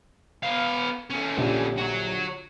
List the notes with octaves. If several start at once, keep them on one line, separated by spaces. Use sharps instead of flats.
B3 F5
A3 C#4
A#1 D3 G4
F#4 C#5